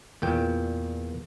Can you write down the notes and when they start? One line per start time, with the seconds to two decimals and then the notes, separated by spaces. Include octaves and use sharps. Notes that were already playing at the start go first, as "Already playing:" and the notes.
0.22 E2 A#2 G5